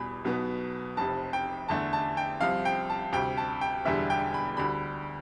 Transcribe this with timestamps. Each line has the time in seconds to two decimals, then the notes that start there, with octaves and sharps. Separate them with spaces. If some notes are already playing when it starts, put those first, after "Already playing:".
Already playing: E2 B2 G3 B5
0.24 B1 B2 B3
0.97 F1 F2 C3 A5
1.33 G5
1.68 E2 D3 A3 A5
1.93 A5
2.17 G5
2.41 C2 C3 F3 F5
2.65 G5
2.90 A5
3.13 D2 C3 G3 G5
3.37 A5
3.61 G5
3.85 E1 E2 D3 G3 E5
4.10 G5
4.34 B5
4.57 D2 D3 G3 B5